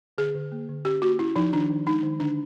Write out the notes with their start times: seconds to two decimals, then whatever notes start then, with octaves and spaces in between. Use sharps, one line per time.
0.18 D3 G#4
0.35 D3
0.52 A#3
0.69 D3
0.85 C#4 G4
1.02 A#3 F#4
1.19 C#4 E4
1.36 F3 D#4
1.53 D#3 D4
1.69 D#3
1.86 G#3 D#4
2.03 D#3
2.19 D3 D4